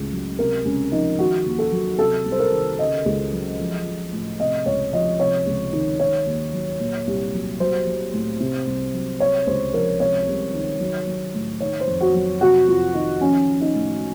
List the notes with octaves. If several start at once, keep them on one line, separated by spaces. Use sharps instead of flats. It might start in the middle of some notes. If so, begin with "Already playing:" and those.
Already playing: C#2 A2 C#3
F#3
C3 A#4
C#2 C#4
F3 D#4
D#3 F#4
D#2
A4
F#3
C3 A4
C2
C5
A#4
D#3
C#3 D#5
C#2
F#3
F3
F3
A2
C3 D#5
C#2 C#5
F3 D#5
C3 C#5
C#2
D#3
D#3 C#5
D#2
F#3
A#2
C2
F#3
F#3 C5
F#3
A2
C3
C2
F#3
C3 C#5
C#2 C5
F3 A#4
C3 C#5
C2
D#3
F#3
F#3
A2
D#3 C#5
C5
F2
F#4
F#3
C3 F#4
F2 F4
D#3 D#4
F3 C#4
F3
D#4
A2